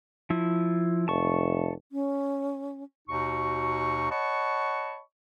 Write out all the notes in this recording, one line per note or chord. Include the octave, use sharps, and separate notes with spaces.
F3 E4
F1 A5 C#6
C#4
D#2 B2 D#4 F#4 C#6
C#5 D#5 F#5 A5 B5 C#6